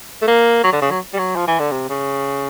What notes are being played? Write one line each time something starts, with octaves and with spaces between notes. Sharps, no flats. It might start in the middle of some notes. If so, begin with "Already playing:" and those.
A3
A#3
F#3
D3
C#3
F#3
G3
F#3
F3
E3
D3
C3
C#3